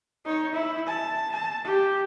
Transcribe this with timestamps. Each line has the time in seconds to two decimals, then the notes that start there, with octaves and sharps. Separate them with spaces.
0.25 D#4 C#5
0.54 E4
0.87 A5
1.32 A5
1.64 G4